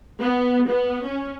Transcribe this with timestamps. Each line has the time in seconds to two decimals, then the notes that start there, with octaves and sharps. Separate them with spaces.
0.21 B3
0.68 B3
1.06 C#4